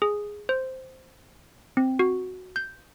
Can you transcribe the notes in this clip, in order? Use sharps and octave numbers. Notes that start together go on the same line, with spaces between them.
G#4
C5
C4
F#4
G6